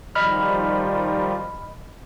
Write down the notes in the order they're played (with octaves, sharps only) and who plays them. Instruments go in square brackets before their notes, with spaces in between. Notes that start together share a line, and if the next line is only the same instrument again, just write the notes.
[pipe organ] D#3 F3 G3 [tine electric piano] D#5 B5 F6